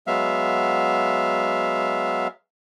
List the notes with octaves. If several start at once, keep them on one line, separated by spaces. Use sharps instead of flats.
F#3 G#3 B3 E5 F5